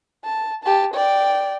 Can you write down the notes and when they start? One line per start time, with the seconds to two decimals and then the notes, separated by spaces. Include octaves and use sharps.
0.25 A5
0.64 G4 A5
0.94 D5 G5